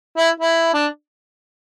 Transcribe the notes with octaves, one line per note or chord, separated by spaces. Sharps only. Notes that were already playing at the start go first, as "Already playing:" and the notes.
E4
E4
D4